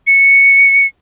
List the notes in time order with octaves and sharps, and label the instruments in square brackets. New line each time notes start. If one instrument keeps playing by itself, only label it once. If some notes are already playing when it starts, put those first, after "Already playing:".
[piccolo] C#7